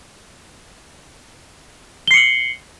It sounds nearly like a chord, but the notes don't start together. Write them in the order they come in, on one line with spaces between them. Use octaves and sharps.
G7 C7 C#7 F#7